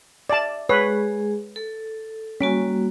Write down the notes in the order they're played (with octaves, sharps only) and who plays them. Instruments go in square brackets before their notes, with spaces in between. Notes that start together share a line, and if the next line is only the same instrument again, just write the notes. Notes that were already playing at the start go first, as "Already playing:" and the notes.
[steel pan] D5 A5 [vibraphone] E5
[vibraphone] G#3 G#4 [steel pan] B4 C#5
[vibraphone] A4
[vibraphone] G3 A#3 F#4 [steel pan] C#4